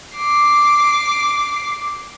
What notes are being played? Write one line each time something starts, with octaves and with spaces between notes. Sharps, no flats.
D6 C7